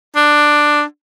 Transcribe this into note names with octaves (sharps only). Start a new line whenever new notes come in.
D4